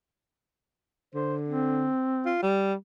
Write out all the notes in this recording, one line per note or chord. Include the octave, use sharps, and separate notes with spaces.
D3 C5
C4
F4
G3